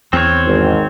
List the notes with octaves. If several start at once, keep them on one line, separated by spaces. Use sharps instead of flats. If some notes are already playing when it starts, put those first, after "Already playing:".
E2 C4 C#5
G#1